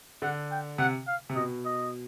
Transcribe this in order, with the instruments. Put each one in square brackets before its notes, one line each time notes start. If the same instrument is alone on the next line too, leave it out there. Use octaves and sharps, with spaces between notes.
[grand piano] D3 [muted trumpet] F#5
[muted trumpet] G5
[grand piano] C3 [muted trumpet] F#5
[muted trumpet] F5
[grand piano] C3
[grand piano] B2 [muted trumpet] D#5
[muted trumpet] D#5